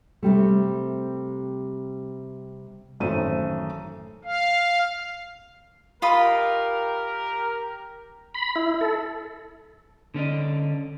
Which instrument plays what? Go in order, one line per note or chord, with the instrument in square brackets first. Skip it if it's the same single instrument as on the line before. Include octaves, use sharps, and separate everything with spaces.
[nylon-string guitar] C3 G3 A3
[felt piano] A1 F#2 D#3 A3 C5 D#7
[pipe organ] F5
[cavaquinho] F4 D#5 B5 [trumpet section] G4 A#4
[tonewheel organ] B5
E4
A4
[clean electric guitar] D3 C#4 D4 D#5